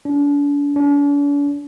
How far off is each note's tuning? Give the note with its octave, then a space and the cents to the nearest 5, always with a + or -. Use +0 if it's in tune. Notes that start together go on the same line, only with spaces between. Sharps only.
D4 -40
D4 -45